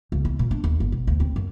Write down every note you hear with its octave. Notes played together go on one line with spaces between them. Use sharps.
C#2
E3
A#2
D4
D#2
G1
B2
D2
C4
F#2